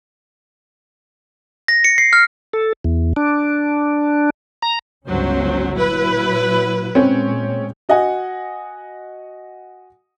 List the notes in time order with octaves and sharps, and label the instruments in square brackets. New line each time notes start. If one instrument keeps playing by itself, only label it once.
[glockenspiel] A#6
C#7
C7
F6
[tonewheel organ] A4
E2
D4
A#5
[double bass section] G1 C#2 C#4 [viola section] F#3 C5
[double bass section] A#2 F#3 [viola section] E4 B4
[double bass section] A#2 G#3 [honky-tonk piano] C4 C#4
[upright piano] F#4 D#5 F#5 G#5